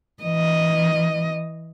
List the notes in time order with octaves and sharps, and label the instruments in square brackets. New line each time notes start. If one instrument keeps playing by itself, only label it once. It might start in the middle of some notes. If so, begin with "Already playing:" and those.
[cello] E3 D#5